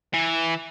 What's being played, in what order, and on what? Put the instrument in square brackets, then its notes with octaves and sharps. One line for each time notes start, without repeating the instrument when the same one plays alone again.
[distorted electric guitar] E3